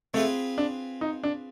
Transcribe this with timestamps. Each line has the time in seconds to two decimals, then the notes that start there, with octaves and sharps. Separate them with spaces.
0.14 A3 C4 F4 G#4 B4
0.58 D4
1.01 D#4
1.23 D4